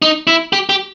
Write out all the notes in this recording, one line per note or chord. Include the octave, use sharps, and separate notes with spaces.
D#4
E4
G4
G4